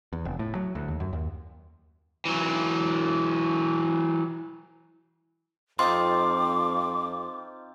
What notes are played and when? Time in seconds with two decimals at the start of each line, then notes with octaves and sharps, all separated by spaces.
0.13 E2
0.25 F1
0.39 A2
0.55 F#3
0.75 D2
0.88 D#2
1.00 F#2
1.13 D#2
2.25 E3 F#3
5.79 F2 C4 D#4 F4 C6 D6